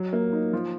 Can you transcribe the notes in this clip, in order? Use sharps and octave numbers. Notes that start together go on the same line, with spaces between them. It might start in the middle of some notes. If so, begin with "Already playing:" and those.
Already playing: F#3
A#3
D#4
F3